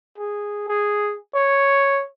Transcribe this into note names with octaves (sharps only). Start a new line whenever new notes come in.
G#4
G#4
C#5